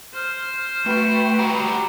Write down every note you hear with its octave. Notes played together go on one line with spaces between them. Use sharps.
C5 F6
A3 F#4 B4 G5
G4 F#5 A#5